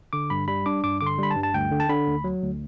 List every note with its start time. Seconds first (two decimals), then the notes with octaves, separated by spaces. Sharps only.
0.13 D3 D6
0.30 G2 B5
0.48 G3 B5
0.66 D4 D6
0.84 G2 D6
1.01 D3 D6
1.07 C6
1.19 G3 B5
1.31 A5
1.36 G2
1.43 A5
1.54 D2 G5
1.72 D3
1.80 A5
1.89 D3 B5
2.07 D2
2.24 F#3
2.42 D2